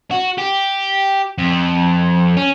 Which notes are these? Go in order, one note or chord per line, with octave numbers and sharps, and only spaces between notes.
F#4
G4
F2
C#4